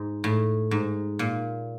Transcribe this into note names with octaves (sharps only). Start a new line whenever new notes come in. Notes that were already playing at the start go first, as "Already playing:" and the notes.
Already playing: G#2
A2
G#2
A#2